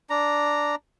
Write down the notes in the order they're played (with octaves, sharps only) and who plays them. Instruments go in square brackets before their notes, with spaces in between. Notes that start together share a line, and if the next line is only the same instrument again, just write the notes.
[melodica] D4 A#5